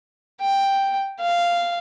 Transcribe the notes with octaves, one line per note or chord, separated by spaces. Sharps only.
G5
F5